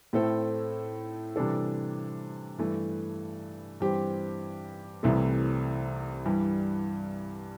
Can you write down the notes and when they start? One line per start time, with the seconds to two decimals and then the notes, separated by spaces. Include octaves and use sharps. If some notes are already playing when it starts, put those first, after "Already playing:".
0.13 A2 A3 C4 E4 A4
1.36 C3 E3 G3 D4 A4
2.58 G2 E3 A3
3.80 G2 E3 C4 G4
5.03 C2 C3 E3 A3 E4
6.26 G2 E3 G3